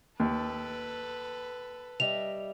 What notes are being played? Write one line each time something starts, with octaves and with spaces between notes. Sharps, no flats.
D#2 A4 B4
G3 D#5 E5 F7